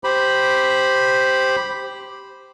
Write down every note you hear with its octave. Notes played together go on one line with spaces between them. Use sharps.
G4 C5 B5